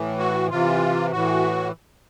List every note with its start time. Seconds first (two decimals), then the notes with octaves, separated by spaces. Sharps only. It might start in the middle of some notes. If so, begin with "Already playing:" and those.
Already playing: A2 E3
0.19 F#4
0.50 C3 E3 F4
1.12 A2 E3 F#4